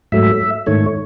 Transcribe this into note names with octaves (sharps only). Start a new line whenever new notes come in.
G#2 F#3 A3 E5
G#2 D#3 A3 C#5